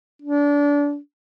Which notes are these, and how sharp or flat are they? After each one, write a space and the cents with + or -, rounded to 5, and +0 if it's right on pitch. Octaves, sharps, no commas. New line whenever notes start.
D4 -25